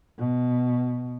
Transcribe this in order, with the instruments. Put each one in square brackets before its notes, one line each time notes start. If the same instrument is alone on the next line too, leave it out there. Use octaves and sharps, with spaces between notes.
[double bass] B2